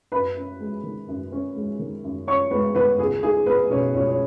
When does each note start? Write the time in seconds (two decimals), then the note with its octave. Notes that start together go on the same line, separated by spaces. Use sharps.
0.12 F#2 B4 B5
0.37 C#4
0.60 G#3
0.83 D#3
1.08 F#2
1.32 C#4
1.56 G#3
1.79 D#3
2.04 F#2
2.27 C#4 C#5 C#6
2.51 G#3 B3 B4
2.75 D#3 B3 B4
2.99 C#2 G#4
3.23 D#4 G#4
3.46 B3 B4
3.70 B2 C#4 C#5
3.94 C#2 C#4 C#5
4.09 C#5